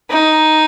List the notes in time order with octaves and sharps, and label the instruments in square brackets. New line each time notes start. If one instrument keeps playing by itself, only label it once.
[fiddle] D#4